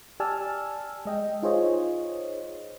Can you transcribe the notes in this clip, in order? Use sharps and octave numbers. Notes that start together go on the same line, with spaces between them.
G4 D5 G#5 A5 E6 F6
G#3 D#5 G5
D#4 F4 G#4 C5 C#5 D#5